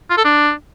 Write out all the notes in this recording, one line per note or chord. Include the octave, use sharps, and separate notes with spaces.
F4
A4
D4